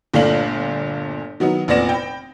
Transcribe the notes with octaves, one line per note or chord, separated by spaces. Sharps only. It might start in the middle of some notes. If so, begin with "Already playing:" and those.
G1 A#2 A3 D4 F5 F#7
D#3 F#3 B3 D#4
F1 A#2 B3 D5 A#6 E7
G5 B5